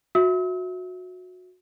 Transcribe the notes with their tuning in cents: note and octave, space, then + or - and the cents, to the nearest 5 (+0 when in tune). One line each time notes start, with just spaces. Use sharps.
F#4 -20 E5 +0 E6 -45